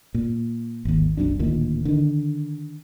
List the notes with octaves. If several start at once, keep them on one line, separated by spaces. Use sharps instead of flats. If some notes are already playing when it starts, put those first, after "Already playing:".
A#2
G#1 D#2
E1 B1 F#2 D4
D1 D2 A#2 D#3
D3 D#3